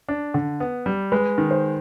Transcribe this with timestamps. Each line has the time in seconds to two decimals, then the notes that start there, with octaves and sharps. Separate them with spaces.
0.08 D4
0.34 D3
0.60 B3
0.86 G3
1.12 G#3 B4
1.38 D#3
1.51 C5